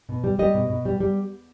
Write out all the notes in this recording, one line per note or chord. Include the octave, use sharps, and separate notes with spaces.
B2
G3
G3 D#5
B2
B2
G3
G3